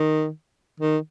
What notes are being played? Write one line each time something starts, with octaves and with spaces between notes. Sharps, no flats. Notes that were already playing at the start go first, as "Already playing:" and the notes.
Already playing: D#3
D#3